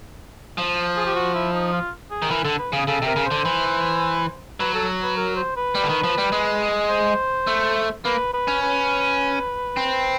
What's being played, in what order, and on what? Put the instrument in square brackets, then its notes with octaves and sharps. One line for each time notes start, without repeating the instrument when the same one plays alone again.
[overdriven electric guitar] F3
[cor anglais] G#4
G4
F#4
E4
D#4
F4
G#4
[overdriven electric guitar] D#3
[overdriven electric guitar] E3 [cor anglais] A#4
[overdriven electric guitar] D3 [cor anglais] A4
[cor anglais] B4
[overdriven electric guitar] C#3 [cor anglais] G#4
[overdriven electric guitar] C#3 [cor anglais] A4
[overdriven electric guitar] C3 [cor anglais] A#4
[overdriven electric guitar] C#3
[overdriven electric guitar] D3 [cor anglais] C5
[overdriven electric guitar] E3
[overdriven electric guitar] F#3 [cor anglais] B4
[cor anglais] A4
B4
A#4
C5
B4
[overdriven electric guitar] G3
D3
D#3
F3
G3
G#3
[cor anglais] C5
[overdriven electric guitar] A3
[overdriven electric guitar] A#3 [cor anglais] B4
[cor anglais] B4
[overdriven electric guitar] C#4
[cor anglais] B4
[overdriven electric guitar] C4